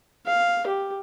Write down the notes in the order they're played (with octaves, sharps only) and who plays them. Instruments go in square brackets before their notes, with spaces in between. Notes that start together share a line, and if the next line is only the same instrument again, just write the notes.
[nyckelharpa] F5
G4